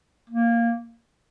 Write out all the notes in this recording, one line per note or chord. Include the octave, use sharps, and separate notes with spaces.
A#3